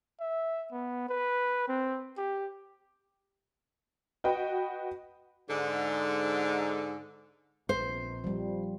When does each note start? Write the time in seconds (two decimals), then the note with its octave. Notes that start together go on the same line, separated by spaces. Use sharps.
0.20 E5
0.72 B3
1.09 B4
1.69 C4
2.18 G4
4.24 F#4 B4 D#5 G5
5.50 G#2 D3
7.69 A#1 C4 C5
8.24 F3 G3